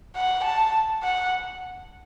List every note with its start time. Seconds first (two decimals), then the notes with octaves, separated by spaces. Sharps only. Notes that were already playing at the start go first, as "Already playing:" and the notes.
0.16 F#5
0.45 A5
1.03 F#5